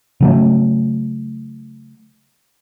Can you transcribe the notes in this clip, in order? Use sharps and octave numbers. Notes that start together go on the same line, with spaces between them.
C#3 F#3 A3